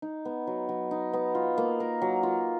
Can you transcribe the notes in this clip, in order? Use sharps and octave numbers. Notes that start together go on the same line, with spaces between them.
D#4
B3
F#3
F#3
D#4
B3
F4
A#3
A#4
F#3
F4